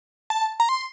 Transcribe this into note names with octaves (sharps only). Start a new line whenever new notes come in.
A5
A#5
C6